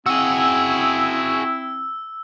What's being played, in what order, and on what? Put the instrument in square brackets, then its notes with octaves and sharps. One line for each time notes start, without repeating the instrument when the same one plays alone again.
[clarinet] C4 [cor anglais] E4 [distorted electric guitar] F#4 G#4 [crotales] E6